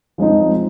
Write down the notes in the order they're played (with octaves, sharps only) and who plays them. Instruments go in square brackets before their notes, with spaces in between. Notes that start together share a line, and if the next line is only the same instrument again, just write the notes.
[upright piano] F3 G#3 C4 D#4